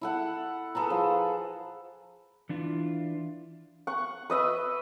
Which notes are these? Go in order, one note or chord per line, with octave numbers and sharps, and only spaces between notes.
E4 A4 F#5
G#4 A4 B4 A#5
F3
E3 D4 F4
F#5 C#6
B4 D#5 E5